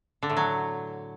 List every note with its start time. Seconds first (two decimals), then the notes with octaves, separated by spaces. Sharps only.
0.23 D3
0.30 A2
0.37 F#3